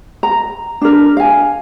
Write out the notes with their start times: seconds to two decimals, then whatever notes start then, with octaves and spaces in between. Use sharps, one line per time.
0.23 A#5
0.81 D4 A#4
1.17 F5 G#5